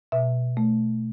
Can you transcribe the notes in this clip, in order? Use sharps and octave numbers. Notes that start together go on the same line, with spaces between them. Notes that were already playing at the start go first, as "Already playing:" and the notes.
B2 E5
A3